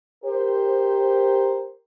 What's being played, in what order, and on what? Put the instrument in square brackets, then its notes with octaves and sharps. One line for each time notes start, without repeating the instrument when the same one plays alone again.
[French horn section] G4 A#4 C5